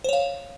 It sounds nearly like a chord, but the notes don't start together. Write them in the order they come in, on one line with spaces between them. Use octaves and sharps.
C5 C#5 F5